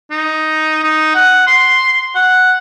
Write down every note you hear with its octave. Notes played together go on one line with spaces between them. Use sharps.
D#4
D#4
F#5
C6
F#5